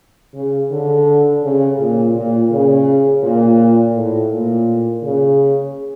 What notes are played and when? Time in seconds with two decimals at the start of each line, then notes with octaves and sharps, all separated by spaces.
0.35 C#3
0.71 D3
1.44 C#3
1.79 A#2
2.15 A#2
2.51 C#3
3.23 A#2
3.95 A2
4.32 A#2
5.03 C#3